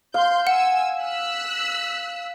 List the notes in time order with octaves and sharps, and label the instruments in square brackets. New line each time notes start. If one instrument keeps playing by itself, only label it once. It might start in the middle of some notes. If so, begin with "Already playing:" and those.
[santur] F5 [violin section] C6 G6
[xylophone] F#5 [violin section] G#5 E6
[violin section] E6 F#6 B6